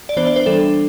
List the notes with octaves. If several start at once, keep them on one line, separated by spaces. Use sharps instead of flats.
D5
E3 B3 D4 C5
D5
C5
E3 G3 D4 A4